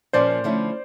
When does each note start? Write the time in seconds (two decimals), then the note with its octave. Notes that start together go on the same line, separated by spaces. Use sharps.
0.13 A#2 F3 A#3 C#4 C5 D5
0.44 D3 F3 A3 C#4 E4